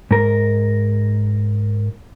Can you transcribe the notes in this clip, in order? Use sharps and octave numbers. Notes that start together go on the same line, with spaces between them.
G#2 A#4